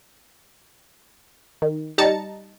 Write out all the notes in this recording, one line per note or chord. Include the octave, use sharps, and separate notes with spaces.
D#3
G3 D#4 A5 A#5 A6 C#7